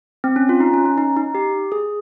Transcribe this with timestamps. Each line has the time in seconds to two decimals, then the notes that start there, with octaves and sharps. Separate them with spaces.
0.24 C4
0.36 C#4
0.49 F4
0.60 D#4
0.73 C#4
0.86 C#4
0.98 D#4
1.17 D#4
1.35 G4
1.72 G#4